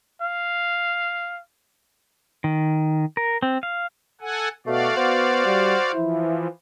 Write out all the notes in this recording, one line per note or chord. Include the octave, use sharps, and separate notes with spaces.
F5
D#3
A#4
C4
F5
A4 F#5 G#5
B2 A3 F#4 D5 F5
B3 C5
G3
E3 F3 E4